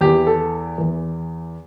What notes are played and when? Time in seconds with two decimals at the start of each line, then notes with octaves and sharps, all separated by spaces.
0.01 E2 E3 G4
0.27 A4
0.78 E2 E3